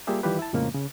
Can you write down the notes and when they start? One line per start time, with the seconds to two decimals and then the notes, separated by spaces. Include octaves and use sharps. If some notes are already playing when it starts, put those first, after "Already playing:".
0.07 G3 A#3 F4 G4 G#4 E5
0.23 D#3 E3 G3 F4 G4 B4
0.39 E4 A5
0.53 F2 A2 C#3 F3 G#3 A#3
0.75 C#3